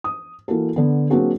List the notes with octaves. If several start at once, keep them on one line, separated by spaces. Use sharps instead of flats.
D#6
E3 A#3 F#4 A4
D3 B3
F#3 A#3 C4 D4 F#4 G#4